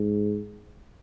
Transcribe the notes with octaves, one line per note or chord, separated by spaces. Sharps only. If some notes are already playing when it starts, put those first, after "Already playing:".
Already playing: G#2